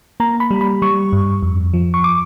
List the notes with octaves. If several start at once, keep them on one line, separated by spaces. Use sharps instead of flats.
A#3 A#5
B5
G3
B5
G3 C#6
G2
F2
F3
C#6
D6